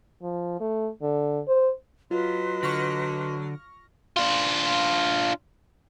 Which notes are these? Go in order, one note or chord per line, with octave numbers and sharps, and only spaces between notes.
F3
A3
D3
C5
F#3 F4 B4 D#5 C6
D3 C#6 F6 A#6
D4 F4